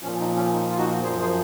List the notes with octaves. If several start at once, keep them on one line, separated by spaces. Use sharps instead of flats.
A#2 F3 C#4
D#4
C#4
D#4
F4
D#4 F#4
F#2 F3 G#4 C5
G#4 C5